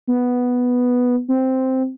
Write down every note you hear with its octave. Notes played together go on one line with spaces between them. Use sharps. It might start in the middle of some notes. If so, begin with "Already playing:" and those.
B3
C4